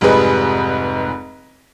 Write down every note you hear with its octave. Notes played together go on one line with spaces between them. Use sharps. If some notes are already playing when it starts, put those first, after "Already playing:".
F1 G#2 G3 G#4 B4 D#5